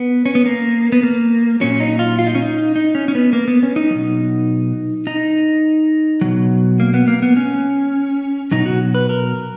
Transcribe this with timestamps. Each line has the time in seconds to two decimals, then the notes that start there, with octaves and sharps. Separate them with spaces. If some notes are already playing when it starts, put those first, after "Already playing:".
Already playing: B3
0.26 C#4
0.35 B3
0.46 A#3
0.92 B3
1.03 A#3
1.60 A#2 F#3 C#4
1.80 D#4
1.99 F4
2.19 F4
2.27 D#4
2.35 C#4
2.42 D#4
2.76 D#4
2.95 C#4
3.08 C#4
3.15 B3
3.33 A#3
3.48 B3
3.63 C#4
3.76 D#4
3.90 B2 F#3
5.07 D#4
6.21 B2 F#3
6.80 A#3
6.94 B3
7.08 A#3
7.22 B3
7.36 C#4
8.51 B2 F#3 D#4
8.66 F#4
8.95 B4
9.09 A#4